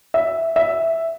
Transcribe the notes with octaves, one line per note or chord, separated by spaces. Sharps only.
E5
E5